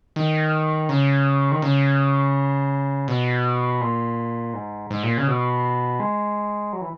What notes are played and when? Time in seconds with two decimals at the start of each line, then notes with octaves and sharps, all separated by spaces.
0.16 D#3
0.89 C#3
1.52 D#3
1.62 C#3
3.08 B2
3.81 A#2
4.54 G#2
4.91 G#2
5.03 A#2
5.18 C#3
5.28 B2
6.00 G#3
6.73 F#3
6.81 E3